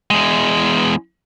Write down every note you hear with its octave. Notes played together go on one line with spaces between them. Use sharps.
E2 G#3